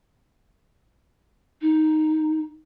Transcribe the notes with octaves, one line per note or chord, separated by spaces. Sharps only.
D#4